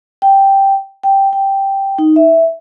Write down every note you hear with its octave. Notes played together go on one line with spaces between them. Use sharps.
G5
G5
G5
D#4
E5